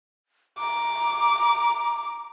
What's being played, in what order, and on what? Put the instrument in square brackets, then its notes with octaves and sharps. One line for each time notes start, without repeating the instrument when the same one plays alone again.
[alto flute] A#5 [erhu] D6